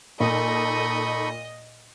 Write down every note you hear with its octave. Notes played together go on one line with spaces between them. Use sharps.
A#2 D#4 A4 D#5 B5 C#6